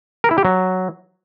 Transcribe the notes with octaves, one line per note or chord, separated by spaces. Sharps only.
A#4
E4
G4
F#3